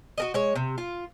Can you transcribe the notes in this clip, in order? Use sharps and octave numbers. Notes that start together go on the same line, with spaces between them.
F#4 A#4 D#5
G#3 C#5
C3
F4